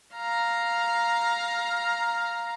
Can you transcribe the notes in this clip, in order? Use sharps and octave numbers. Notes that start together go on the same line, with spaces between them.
F5 A#5